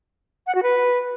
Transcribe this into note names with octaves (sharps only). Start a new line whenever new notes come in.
F#5
F#4
B4